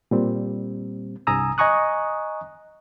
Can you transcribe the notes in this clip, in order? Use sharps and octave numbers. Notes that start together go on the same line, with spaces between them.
A#2 G3 C4
C2 G2 G#5 A#5 D#6 E6
D#5 G#5 A#5 C#6 D#6 F#6